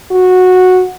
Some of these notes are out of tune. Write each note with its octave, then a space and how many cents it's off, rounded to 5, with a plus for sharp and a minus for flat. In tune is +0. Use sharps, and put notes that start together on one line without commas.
F#4 -10